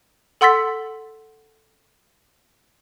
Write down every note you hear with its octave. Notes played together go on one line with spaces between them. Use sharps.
A4 F#5 C6 E6 A6 B6